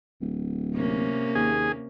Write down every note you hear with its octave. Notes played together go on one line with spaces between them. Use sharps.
D1
C3 A#3 C#4
D#2 G#4